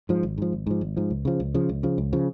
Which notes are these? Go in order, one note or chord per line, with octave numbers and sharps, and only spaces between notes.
G#2 F3
G#1
G#2 F3
G#1
G#2 F3
G#1
G#2 F3
C#2
C#3 F3
C#2
C#3 F3
C#2
C#3 F3
C#2
C#3 F3